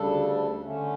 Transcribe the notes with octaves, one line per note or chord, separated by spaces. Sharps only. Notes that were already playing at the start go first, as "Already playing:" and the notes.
Already playing: D2 C#3 G3 D4 A4
D3 A3 C#4